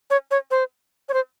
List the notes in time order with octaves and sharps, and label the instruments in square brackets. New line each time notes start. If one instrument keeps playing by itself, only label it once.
[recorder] C#5
C#5
C5
C#5
C5